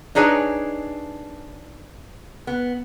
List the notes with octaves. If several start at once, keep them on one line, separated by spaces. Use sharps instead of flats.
D4 D#4 G#4 B4 C#5 G#5
B3